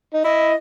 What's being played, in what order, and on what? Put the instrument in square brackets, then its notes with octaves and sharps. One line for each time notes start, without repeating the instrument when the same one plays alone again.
[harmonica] D#4
[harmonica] E4 [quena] D#5